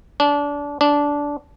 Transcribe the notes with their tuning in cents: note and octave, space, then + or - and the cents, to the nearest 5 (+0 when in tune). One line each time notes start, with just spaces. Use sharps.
D4 -25
D4 -15